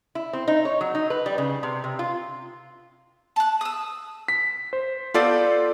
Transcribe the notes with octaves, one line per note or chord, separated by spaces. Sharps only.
E4
C4
D#4
C#5
F#3
D#4
B4
G3
C#3
C3
C3
F4
A5 F#6
D#6 E6
B6
C5
B3 C4 F4 G4 A4 D5